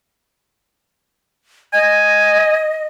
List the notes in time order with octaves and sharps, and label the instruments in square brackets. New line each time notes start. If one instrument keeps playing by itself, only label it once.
[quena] D#5 [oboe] G#5